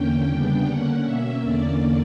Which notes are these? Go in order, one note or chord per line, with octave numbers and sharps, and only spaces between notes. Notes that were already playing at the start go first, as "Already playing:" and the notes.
Already playing: E2 D3 A#3 C#4 G5
C#3 G3 B3 D4
D3 A#3 C#4 F#5
B2 A#3 C#4 E5
E2 D3 A#3 C#4 D5